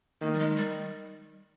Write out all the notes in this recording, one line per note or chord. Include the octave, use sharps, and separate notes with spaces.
D#3 A#3
G3
G#3
G3